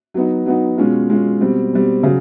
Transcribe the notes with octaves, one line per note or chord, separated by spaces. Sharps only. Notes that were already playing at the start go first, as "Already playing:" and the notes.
F#3 B3 D#4
F#3 B3 D#4
B2 G#3 C#4 F4
B2 G#3 C#4 F4
B2 G3 C4
B2 G3 C4
C#3 F#3